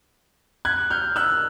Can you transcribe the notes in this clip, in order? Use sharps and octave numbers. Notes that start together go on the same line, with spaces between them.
F#6 G#6
F6 G6
E6 F#6